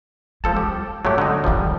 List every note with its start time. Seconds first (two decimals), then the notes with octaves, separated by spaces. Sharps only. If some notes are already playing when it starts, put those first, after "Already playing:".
0.44 F3 G#3 A4 A5
0.57 G3 G4
1.05 G#2 F#3 A3 G4
1.18 D3 D#4
1.44 F2 D#3 F3 G3